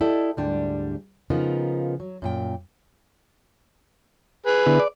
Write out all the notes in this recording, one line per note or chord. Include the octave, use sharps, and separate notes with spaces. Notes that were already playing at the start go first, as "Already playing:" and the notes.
E4 G4 A4 D5 D#5
D2 G#2 G3 D4 G4
C#3 F3 B3 D#4 F4 A#4
F#3
F#2 A#2 G5
G#4 B4
D3 B3 E4
D5